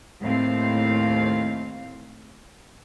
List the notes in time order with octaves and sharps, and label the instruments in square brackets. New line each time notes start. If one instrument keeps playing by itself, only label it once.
[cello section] D#2 A2 C4 F5